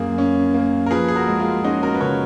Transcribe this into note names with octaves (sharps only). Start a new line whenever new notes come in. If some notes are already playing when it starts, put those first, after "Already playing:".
Already playing: F#2 A#3 G#4
C#4
A#3
A#4
F3 G#4 B4
G#4
F#4 A#4
G#3
F4 G#4
C#4 D#4 F#4
F#4 A#4
B4
C#3 A#4 C#5